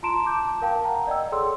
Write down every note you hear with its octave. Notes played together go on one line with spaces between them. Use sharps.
F4 A5 A#5 C6 D7 E7
A5 D6 G6
A#4 F5 G5 A5
F#5 A#5
D5 D#5 G5 E6
G#4 A4 C#5 C6 E6